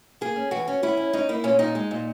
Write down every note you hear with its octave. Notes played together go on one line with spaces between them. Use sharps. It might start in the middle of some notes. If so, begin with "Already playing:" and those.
A#3 G#4
C#4
E3 F#4
C#4
C#4 E4
C#4
C#4 D#4
A#3 E4
A#2 C#4
A#2 D#4
G#3
A#2